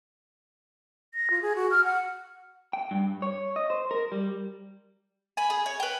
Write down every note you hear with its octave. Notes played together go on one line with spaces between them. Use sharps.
A#6
F4
G#4
F#4
F6
F#5
G5
G2
C#5
D#5
C5
A#4
G3
G#5 B5
G#4
C#5
B4 G5